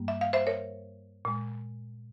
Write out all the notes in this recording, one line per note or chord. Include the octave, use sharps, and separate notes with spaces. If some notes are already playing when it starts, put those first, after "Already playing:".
Already playing: G2 G3 A#3
E5
F5
C5 E5
A#4 C#5
A#2 G#3